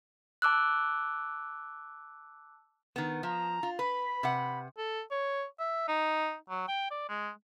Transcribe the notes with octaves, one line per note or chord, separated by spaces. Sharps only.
A5 D6 E6 F#6
D#3 B3
F3 A#5
F4
B4 B5
C3 F#5
A4
C#5
E5
D#4
F#3
G5
D5
G#3